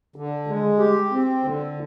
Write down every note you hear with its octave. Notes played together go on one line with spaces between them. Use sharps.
D3
G#3
G4
C4
D3